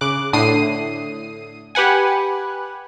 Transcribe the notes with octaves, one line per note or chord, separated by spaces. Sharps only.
C#3 D6 F#6
A2 D3 D#6 C7 D#7
G4 B4 F#5 G#5